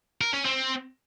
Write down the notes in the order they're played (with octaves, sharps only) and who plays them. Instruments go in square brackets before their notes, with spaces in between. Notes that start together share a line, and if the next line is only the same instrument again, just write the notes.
[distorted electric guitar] A#4
C#4
C4